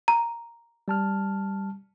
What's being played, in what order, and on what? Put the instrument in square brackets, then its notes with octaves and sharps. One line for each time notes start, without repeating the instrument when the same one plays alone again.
[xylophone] A#5
[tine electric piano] G3 A5 F6